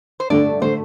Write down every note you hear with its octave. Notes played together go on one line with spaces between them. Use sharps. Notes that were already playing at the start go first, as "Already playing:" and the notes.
C5
G2 D3 A3 D4 D5
D3 A3 C5